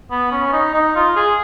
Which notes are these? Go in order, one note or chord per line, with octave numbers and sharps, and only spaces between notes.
B3
C#4
D#4
D#4
F4
G#4